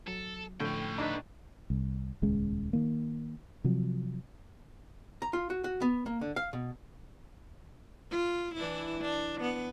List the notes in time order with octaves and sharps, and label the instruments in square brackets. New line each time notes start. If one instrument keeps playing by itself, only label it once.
[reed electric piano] F#3 [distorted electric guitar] A4
[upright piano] A2 [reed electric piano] D3 F3 [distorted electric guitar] C#4 G5
[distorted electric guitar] A#3 B4 [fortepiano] D4 D#4
[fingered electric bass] C2
D#1 C#2 C#3 G#3
D#3 A#3
C3 F3 F#3
[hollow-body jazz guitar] A#5
F4
F#4
F#4
B3
A#3
D3
F5
B2
[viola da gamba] F4
E3 D4 E4
D4
B3